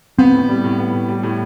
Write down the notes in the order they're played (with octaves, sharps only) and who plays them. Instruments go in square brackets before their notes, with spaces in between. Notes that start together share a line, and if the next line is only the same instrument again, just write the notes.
[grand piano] B3 [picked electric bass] C4
[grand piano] A2
G3
A2
B3
A2
G3
A2